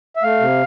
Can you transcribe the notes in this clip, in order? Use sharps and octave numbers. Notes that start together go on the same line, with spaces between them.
E5
A3 F5
C3